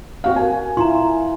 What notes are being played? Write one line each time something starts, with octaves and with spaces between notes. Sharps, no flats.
C4 F#4 F5
A#4 G#5
E4 F4 A#5 C6